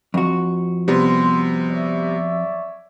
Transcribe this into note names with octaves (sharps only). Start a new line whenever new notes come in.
F2 F#4
C3 G3 B3 C6
C#5 D5 E5